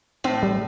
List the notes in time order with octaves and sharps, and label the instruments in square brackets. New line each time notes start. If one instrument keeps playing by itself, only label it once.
[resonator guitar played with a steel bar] A2 [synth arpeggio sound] C4
[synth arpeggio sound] G3